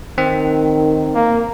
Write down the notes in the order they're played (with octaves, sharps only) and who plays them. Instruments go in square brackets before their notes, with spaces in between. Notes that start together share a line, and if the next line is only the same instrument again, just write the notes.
[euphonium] D#3 [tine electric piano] C4
[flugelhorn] A#3